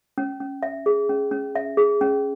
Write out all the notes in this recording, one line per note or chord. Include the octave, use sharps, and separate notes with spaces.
C#4
C#4
E5
G#4
C#4
C#4
E5
G#4
C#4